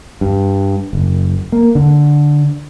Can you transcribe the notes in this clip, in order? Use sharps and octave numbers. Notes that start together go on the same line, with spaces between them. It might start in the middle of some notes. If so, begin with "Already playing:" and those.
G2
F#1
A#3
D3